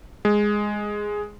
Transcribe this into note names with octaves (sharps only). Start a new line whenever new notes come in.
G#3